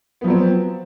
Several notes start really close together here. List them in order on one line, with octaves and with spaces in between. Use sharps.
B3 F3 F#3 C4